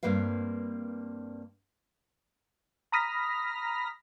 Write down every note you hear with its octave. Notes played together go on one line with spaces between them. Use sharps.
G2 A#3 C4 B4 F5
A#5 B5 D#6 F6 A#6 B6